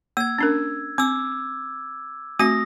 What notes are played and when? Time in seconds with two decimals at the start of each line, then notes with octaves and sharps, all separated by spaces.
0.17 A#3 E6 G#6
0.38 C#4 D4 A#4
0.98 C4 D6 E6
2.39 A3 C4 F#4 D#6 A#6